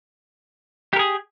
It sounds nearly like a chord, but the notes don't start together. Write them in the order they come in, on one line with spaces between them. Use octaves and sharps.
G4 A#4 G#4